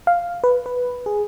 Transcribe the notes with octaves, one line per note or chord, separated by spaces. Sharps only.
F5
B4
B4
G#4